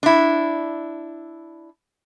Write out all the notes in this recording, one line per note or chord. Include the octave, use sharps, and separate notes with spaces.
D4 E4